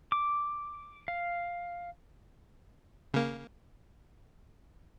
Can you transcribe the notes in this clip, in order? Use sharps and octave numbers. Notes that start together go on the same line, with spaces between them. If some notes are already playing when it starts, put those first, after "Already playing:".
D6
F5
C#3 A#3